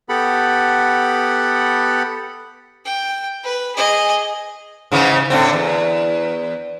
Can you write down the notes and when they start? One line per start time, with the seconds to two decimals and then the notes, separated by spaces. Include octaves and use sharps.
0.09 B3 G4 A4 F#5 B5
2.85 G5
3.44 B4
3.76 G#4 D#5
4.92 G#2 C#3 E3
5.30 A2 D3 C4
5.53 E2